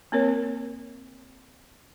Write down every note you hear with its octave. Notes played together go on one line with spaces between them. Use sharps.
A#3 C4 A#4 C#5